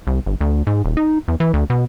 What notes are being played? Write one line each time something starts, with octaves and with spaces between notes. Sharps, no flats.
C2
G1
D2
G#2
D#1
D#4
E2
E3
D2
B2